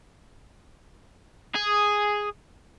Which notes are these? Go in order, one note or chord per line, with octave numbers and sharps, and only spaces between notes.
G#4